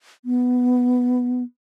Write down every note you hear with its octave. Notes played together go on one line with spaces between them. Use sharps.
B3